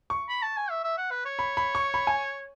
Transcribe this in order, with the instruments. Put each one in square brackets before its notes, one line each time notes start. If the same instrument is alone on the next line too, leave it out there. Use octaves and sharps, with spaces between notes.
[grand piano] C#6
[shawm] B5
A5
G#5
E5
E5
F#5
B4
C#5
[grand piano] B5
B5
C#6
B5
G#5